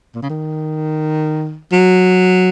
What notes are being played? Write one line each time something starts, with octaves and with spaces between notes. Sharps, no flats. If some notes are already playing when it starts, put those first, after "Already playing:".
A#2
C#3
D#3
F#3